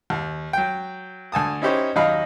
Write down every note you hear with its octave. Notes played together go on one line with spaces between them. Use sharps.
D#2
F#3 G5
D2 G#5 A5 D#6
C#4 D#4 E4 G4 C5 C#5
D#2 F#3 D#4 D#5 F5 B5